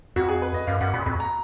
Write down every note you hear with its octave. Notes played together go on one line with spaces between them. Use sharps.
F2 F#4
G#4
B4
D#5
F#2 F5
F#2 F#5
A#2 B5
F2 B5
A#5